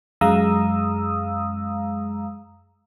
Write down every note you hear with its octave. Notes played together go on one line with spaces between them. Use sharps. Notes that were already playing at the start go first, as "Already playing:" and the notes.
F#2 G#3 F5 A#5 D#6 E6